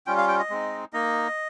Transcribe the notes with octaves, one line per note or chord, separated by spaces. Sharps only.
G3 C#4 F4 G5
F5
G5
D#5
G#3 C4 D#4
A#3 D#4 D#5